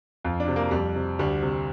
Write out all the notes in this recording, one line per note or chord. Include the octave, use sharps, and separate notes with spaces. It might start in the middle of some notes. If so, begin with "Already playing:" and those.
F2 F4
D4
C3
A#3
F2 G3
C3
D2 G3
C3